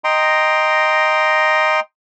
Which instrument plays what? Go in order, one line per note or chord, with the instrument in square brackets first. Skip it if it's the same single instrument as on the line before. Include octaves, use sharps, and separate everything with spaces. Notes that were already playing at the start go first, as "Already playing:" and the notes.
[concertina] D#5 G5 A#5 C6